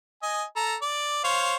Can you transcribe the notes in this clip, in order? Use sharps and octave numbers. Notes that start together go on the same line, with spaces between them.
D#5 G#5
A4 A#5
D5
C5 C#5 F5